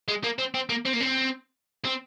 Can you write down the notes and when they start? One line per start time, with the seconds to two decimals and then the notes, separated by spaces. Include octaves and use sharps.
0.08 G#3
0.24 A#3
0.38 C4
0.54 C4
0.69 A#3
0.86 C4
0.94 A#3
1.01 C4
1.85 C4